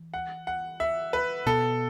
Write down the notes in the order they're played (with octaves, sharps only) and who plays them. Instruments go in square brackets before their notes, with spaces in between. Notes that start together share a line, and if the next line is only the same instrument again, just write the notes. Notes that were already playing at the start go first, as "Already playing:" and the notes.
Already playing: [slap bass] E3
[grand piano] F#5
F#5
E5
B4
[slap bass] B2 B3 [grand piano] A4